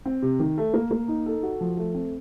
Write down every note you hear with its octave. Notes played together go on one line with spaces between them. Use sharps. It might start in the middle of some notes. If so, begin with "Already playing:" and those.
C4
C3
D#3
A3
A#3
A#3
D#4
A4
F#4
F3
A3
C4